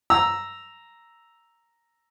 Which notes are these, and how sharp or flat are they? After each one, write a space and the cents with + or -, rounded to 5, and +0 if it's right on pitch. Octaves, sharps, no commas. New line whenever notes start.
A#5 +0 E6 +0